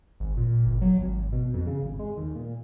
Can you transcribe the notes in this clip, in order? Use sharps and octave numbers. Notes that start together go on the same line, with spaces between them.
G#1
A#2
G1
F#3
G#1
B2
F2
C#3
G#1
G#3
D#2
A#2